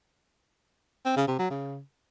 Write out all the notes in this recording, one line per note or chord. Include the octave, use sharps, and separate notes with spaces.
C4
C#3
C3
F#3
C#3